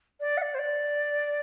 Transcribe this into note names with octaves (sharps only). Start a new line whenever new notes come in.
D5
F#5
D5
C5
D5